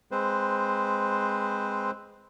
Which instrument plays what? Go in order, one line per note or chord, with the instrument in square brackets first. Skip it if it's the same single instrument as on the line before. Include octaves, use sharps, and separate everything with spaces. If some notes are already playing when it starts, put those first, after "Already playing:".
[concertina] G#3 C4 B4 C5